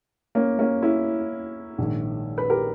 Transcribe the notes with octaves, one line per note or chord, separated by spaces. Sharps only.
A#3 C#4
A#3 C#4
C#4 E4
A#1 G#2 D#3
B4
G4 A#4